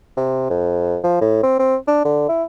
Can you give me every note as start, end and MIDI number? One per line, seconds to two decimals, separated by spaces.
0.17 0.46 48
0.50 0.98 41
1.03 1.20 53
1.21 1.42 45
1.43 1.55 60
1.59 1.76 60
1.87 2.03 62
2.05 2.27 50
2.29 2.44 64